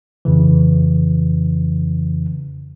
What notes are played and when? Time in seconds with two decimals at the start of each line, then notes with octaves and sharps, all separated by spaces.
0.25 F2 C#3 E3